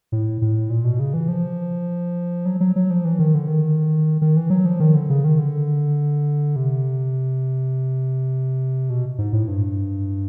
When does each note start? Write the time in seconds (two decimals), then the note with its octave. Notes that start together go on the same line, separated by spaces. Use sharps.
0.12 A2
0.42 A2
0.70 A#2
0.84 B2
1.00 C#3
1.14 E3
1.28 F3
2.45 F#3
2.60 F#3
2.76 F#3
2.90 F3
3.05 E3
3.19 D#3
3.34 D3
3.48 D#3
4.21 D#3
4.37 E3
4.50 F#3
4.65 F3
4.80 D#3
4.94 D3
5.10 C#3
5.24 D#3
5.39 D3
6.56 C3
8.90 B2
9.18 G#2
9.33 A2
9.48 G2